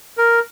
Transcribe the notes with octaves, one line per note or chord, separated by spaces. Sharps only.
A#4